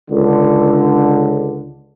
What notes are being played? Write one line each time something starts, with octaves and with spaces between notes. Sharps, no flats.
C#2 D3